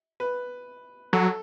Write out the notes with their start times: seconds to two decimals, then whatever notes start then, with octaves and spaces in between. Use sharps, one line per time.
0.20 B4
1.13 F#3 A4